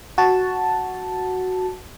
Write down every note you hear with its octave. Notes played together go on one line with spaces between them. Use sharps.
F#4 A5